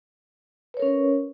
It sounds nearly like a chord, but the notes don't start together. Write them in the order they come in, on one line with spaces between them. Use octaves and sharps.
B4 C#5 A#4 C#4